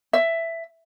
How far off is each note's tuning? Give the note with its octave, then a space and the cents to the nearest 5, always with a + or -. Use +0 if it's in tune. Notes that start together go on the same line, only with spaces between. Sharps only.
E5 +10